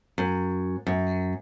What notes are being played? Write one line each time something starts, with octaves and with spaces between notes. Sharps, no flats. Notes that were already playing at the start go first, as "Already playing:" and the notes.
F#2
F#2